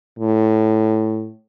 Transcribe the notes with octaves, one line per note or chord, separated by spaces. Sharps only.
A2